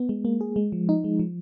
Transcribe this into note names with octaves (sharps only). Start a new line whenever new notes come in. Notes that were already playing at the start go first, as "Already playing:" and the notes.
Already playing: B3
G#3
A#3
G#4
G#3
F3
D#4
G#3
F3